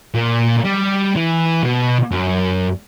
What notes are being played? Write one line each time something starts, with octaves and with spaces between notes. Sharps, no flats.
A#2
G3
E3
B2
F#2